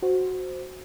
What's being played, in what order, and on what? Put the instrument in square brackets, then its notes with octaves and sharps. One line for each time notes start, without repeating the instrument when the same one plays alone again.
[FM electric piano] F#4 C5